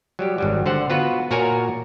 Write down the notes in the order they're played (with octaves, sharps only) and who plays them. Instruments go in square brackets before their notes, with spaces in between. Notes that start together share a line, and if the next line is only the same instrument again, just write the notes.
[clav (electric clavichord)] F#3 G3 G4
G#1 F#3 G3
D3 C5 F#5
B3 F4 F#4 B4
A#2 F#4 A#4 C#5 G#5 A#5